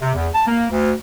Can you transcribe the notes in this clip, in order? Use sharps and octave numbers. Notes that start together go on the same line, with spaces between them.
C3
E2
A5
A#3
D2